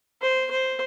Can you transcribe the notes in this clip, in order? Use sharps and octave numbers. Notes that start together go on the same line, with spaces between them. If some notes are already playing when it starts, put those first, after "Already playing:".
C5
C5